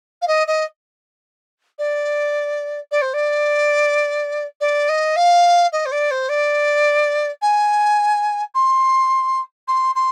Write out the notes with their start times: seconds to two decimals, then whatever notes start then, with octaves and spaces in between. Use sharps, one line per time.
0.22 F5
0.28 D#5
0.47 D#5
1.79 D5
2.91 D5
3.02 C5
3.14 D5
4.61 D5
4.89 D#5
5.16 F5
5.73 D#5
5.86 C5
5.92 D5
6.11 C5
6.29 D5
7.42 G#5
8.55 C6
9.68 C6
9.95 C6